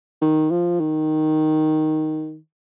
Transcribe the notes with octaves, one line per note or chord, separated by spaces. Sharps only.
D#3
F3
D#3